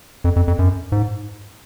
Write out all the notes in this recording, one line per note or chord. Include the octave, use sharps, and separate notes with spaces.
F2
F2
F2
F#2
G#2